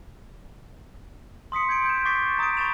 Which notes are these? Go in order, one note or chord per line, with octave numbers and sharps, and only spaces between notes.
C6 D#6 B6 C#7
G6 G#6 C#7 D7
G6 E7
C#6 D6 A6 B6 C7
A#5 D#6 A6 D7
B5 C#6 D#6 A6 E7 F7